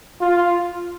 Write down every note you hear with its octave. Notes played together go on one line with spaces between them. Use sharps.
F4